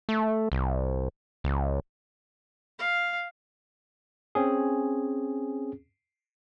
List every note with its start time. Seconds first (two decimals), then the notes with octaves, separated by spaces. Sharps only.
0.09 A3
0.52 C2
1.44 C#2
2.79 F5
4.35 C4 C#4 G#4